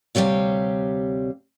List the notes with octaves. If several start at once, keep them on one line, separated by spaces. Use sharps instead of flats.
D2 C3 F#3 G3 C#5 F5